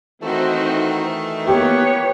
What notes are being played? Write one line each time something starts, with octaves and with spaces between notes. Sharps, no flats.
D#3 E3 A3 C4 D#4 F#4
A#3 B3 G4 B4 C#5